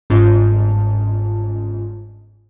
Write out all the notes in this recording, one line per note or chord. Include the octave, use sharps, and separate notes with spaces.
G1 G#2 C#4 F4 A5